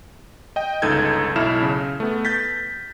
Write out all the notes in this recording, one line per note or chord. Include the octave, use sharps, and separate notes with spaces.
D#5 G5
G1 C#2 D#4 A4 G6 G#6
B1 E4 A5 F6 E7
C#3
A3 B3
G6 A6 B6